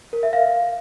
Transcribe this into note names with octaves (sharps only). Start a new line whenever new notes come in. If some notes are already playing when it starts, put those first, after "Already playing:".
A#4
E5
F5